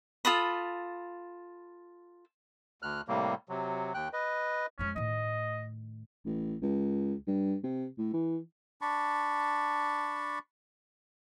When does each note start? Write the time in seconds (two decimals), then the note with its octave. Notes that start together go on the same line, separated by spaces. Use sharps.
0.25 F4 A4 B5 D#6
2.82 D2 F6 F#6
3.08 A2 C3 G3 A#3
3.49 C3 F#3
3.94 D#2 G5 F#6
4.13 B4 D#5
4.79 F2 G#3 C#4
4.96 A2 D#3 D#5
6.25 A1
6.62 C#2
7.27 G2
7.64 C3
7.98 A2
8.13 E3
8.81 D4 A5 B5 C#6